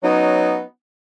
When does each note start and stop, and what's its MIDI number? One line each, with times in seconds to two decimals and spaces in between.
0.03 0.61 54
0.03 0.61 59
0.03 0.61 61
0.03 0.61 63